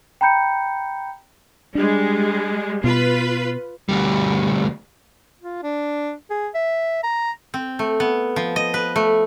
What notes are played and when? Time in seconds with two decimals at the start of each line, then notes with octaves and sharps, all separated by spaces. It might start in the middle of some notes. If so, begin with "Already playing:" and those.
0.21 G5 A#5 B5 G6 C#7
1.75 G3 G#3 D4
2.84 B2 F4 B4
3.89 D2 G3
5.41 F4
5.63 D4
6.30 G#4
6.55 E5
7.03 A#5
7.54 C4
7.79 A3
8.00 B3
8.36 F3
8.56 D#5
8.74 B4
8.96 A3